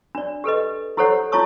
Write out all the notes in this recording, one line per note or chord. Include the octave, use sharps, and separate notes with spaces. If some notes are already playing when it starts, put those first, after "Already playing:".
D4 D5
G4 A4 B4 D#5
E4 G4 A4 C5 C#5 F#5
E4 F4 C#5 A5 C#6 D#6